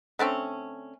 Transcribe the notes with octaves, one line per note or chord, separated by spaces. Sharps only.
D3 A3 C4 C#4